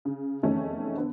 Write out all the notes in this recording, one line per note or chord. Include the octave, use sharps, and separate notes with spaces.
C#3
F1 E2 D#3 A3 C#4 C#5
D3 B3